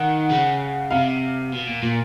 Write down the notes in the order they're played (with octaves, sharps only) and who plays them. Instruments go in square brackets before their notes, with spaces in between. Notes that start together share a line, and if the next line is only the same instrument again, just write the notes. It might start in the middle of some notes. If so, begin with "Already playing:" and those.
Already playing: [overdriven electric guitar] D#3 [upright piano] F#5
[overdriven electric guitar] C#3
[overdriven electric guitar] C3 [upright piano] F5
[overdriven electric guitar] B2
A#2
A#2